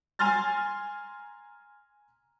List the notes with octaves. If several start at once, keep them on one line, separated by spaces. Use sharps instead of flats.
G#5 A#5 C6 F6 A6